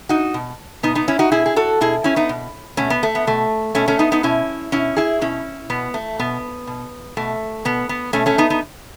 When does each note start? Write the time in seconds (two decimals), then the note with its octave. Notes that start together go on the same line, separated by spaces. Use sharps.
0.09 D#4 F#4
0.34 B2
0.83 B2 B3 D#4
0.95 B3 D#4
1.08 C#4 E4
1.19 D#4 F#4
1.32 B2 E4 G#4
1.46 G#4
1.56 F#4 A4
1.81 B2 E4 G#4
2.04 C#4 E4
2.16 B3 D#4
2.29 B2
2.77 B2 A3 C#4
2.90 B3
3.03 A3
3.15 B3
3.27 B2 A3
3.75 B2 A3 C#4
3.88 A3 C#4
3.99 B3 D#4
4.12 B3 D#4
4.23 B2 C#4 E4
4.72 B2 C#4 E4
4.96 E4 G#4
5.21 B2 C#4 E4
5.70 B2 B3
5.94 A3
6.19 B2 B3
6.67 B2
7.17 B2 A3
7.65 B2 B3
7.89 B3
8.13 B2 A3 C#4
8.26 A3 C#4
8.38 B3 D#4
8.50 B3 D#4